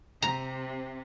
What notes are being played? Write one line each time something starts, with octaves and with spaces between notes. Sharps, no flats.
C3 A#5